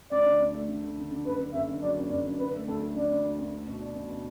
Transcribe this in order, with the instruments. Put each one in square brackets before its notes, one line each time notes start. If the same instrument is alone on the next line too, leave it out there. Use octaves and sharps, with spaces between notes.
[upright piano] D2 [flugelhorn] D5
[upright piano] D3
D2
A3
D3
A3
D3
D3
[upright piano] F#1 [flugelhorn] B4
[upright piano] D3
[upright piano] F#1 [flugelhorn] E5
[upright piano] D3
[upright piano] F#3 [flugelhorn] D5
[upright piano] F#1
[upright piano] F#1 [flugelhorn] D5
[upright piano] D3
[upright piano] D3 [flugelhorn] B4
[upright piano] A3
[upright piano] D2 [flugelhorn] A4
[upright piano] A3
[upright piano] D3 [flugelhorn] D5
[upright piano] D2
D2
D2
A3
B2
D4
B2
B2